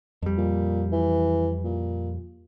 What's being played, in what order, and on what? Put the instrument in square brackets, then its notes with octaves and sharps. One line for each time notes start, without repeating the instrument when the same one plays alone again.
[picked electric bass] F2 G3
[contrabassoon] A#2
E3
A#2